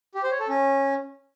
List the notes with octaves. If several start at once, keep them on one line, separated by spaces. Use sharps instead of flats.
G4
C5
C#5
A4
C#4